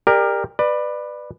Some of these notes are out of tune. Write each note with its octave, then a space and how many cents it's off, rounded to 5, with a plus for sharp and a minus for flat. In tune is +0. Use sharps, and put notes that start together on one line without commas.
G4 +30 A#4 +0 D5 +25
B4 +0 D5 +25